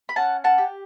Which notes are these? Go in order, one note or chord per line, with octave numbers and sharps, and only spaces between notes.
B5
C#4 F#5 A5
F#5 A5
G4